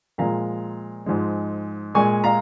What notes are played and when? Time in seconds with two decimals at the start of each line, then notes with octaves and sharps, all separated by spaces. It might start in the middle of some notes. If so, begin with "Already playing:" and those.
0.18 A#2 F3 G#3 F5 A#5
1.06 G#2 F3 G#3
1.95 A#2 G#3 G#5 C#6
2.24 F5 A#5